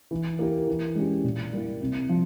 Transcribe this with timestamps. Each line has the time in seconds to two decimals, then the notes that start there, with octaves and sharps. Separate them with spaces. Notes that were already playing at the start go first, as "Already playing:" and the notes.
0.11 E3
0.39 A#3 E4 G4 A#4
0.68 E3
0.95 G#3 C#4 G4
1.24 A#2
1.52 G3 A#3 E4
1.81 C3
2.09 F3